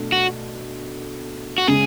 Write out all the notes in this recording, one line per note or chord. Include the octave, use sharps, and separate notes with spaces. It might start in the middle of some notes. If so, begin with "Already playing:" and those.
Already playing: B2 A3 D4
F#4
F#4
C#3 G#3 G#4